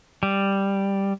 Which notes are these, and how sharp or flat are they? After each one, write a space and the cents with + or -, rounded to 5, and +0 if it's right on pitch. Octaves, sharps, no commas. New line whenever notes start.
G3 +5